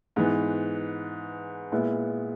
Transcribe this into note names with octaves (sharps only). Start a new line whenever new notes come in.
G#2 E3 B3
A#2 G#3 B3 E4